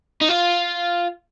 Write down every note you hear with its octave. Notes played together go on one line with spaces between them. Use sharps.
D#4
F4